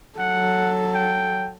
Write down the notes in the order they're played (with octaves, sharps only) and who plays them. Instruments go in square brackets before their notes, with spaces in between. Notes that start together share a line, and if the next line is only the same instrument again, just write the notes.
[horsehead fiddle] F#3 A4 [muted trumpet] F#5
[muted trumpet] G5